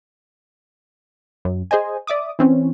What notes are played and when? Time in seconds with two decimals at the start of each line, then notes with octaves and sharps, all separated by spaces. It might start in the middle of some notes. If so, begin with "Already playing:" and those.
1.45 F#2
1.71 G#4 C5 D#5 G#5
2.07 D5 E5 D6 D#6
2.39 E3 C4 C#4